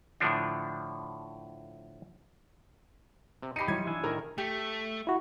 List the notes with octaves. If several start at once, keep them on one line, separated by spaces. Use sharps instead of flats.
A2 D3 F3 D4
C3
D#4 G4 B5 C7 C#7 D#7
E3 F#3 G3 C6 G#6
E3 D4 E4 G#5
A2 D#3 A#4
A3 G4
E4 F#4